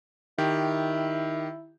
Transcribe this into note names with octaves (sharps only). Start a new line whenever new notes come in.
D#3 E4 G4